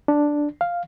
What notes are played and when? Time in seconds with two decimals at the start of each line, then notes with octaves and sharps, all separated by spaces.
0.08 D4
0.61 F5